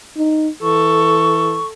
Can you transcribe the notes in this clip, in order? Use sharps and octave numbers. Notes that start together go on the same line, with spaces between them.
D#4
E3 A4 C#6